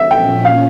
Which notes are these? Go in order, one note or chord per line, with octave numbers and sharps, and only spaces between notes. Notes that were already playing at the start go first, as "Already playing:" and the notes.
Already playing: E5
A#2 F3 C#4 G5
F5